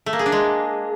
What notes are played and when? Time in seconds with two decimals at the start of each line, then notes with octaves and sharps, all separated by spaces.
0.06 A3
0.13 A#3
0.19 G#4
0.26 D4
0.32 G#3